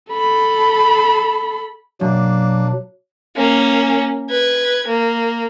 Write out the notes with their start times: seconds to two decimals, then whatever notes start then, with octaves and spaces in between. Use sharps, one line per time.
0.12 A4 B5
2.01 F#2 B2 F#3 A#3 D4
3.36 A#3 C#4
4.30 B4 G#6
4.88 A#3